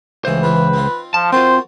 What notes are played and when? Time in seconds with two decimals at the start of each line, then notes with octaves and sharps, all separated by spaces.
0.25 C#2 A2 E3 C5 D#5
0.43 C#3 E3 F4 B4
0.73 C4 D#4 F4
1.14 F3 A5
1.32 C4 F4 F#4 A#4 C5 A5